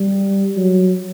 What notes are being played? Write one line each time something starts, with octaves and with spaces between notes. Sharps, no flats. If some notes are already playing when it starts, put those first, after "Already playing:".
Already playing: G3
F#3